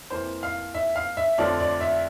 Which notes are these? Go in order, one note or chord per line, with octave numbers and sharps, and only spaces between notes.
F2 E3 A#3 C5
F5
E5
F5
E5
F2 D3 F3 A3 D5
D5
E5